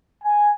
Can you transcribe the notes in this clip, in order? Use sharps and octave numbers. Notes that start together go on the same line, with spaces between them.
G#5